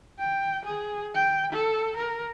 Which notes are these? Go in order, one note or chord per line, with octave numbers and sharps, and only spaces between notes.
G5
G#4
G5
A4
A#4